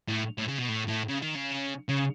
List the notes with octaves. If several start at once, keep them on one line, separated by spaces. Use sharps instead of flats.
A2
A2
C#3
B2
A2
A2
C#3
D#3
C#3
C#3